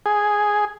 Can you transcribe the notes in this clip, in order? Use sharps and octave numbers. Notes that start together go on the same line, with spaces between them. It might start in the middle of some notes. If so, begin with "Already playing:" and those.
G#4